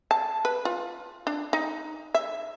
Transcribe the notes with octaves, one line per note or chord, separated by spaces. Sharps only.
A5
B4
F4
D4
D#4
E5